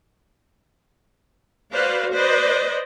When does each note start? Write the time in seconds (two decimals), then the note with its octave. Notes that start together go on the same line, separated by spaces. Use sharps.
1.73 F#4 B4 C5 D5 F5
2.12 B4 C5 D5 D#5